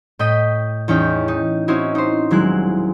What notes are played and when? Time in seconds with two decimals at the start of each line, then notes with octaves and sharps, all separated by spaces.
0.19 A2 D#5 G5 B6 D#7
0.88 E2 C#4 D#4 G5
1.28 D#4
1.68 C4 C#4 D#4 E4 F#4
1.95 D#4 C5
2.31 D#1 F#3 G#3 E4 F#6